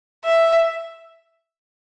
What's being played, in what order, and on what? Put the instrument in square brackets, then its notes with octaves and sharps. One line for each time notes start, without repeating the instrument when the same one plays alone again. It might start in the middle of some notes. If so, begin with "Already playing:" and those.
[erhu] E5